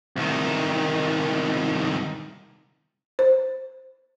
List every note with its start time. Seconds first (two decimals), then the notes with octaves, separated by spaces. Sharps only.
0.16 C2 D#3
3.19 C5